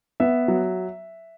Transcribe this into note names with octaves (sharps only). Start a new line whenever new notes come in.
B3 E5
F#3